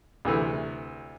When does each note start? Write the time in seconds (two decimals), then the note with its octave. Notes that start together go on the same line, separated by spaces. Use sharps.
0.25 D2 C3 E3 A3